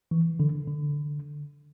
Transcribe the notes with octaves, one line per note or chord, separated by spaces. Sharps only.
E3
D3
D3